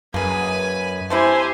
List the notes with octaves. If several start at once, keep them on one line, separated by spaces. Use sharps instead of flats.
F#2 A#3 G#4 B4 G#5
A3 C4 E4 G4 C5 G#5